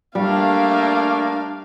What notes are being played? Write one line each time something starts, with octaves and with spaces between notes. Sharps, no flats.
G3 A3 A#3 D4 F5